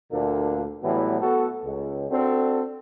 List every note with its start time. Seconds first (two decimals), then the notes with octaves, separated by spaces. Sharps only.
0.12 D2 A#2 A#3 D4 A4
0.83 A2 E3 F#3 G3 B3
1.21 B3 F#4 A4
1.65 C#2
2.10 C4 D4 F#4 A4